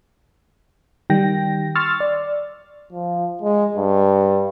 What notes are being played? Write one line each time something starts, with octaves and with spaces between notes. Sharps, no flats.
D#3 G3 G5 A#6
C6 C#6 E6 F6 A6
D5
F3
G#3
G2